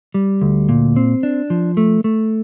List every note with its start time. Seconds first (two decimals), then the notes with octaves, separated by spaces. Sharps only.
0.14 G3
0.41 D2
0.69 A#2
0.96 C4
1.23 D4
1.50 F3
1.77 A3
2.04 A3